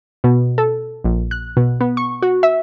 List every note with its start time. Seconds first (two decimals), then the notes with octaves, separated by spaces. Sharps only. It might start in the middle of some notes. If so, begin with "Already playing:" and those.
0.24 B2
0.58 A4
1.04 A#1
1.31 F#6
1.57 B2
1.81 B3
1.97 C#6
2.22 F#4
2.43 E5